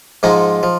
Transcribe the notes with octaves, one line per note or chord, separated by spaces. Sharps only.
G#2 F3 G#3 D#4
F3